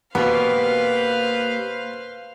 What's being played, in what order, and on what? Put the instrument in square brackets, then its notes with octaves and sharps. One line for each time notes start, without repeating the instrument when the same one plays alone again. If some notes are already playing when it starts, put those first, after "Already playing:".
[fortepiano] B2 B3 [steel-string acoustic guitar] A#3 G4 [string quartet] B4 C5 F5